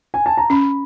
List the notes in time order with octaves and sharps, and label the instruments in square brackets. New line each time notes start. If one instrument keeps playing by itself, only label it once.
[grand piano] G#5
A5
A#5
[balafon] C#4 [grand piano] B5